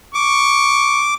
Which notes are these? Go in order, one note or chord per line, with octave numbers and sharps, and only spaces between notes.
C#6 D6